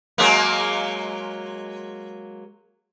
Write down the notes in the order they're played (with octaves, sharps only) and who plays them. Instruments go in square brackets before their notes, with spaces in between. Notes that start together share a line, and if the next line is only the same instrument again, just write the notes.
[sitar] F#3 G#3 A#3